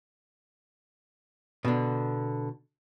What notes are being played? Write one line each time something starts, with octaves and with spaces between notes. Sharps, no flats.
B2 D3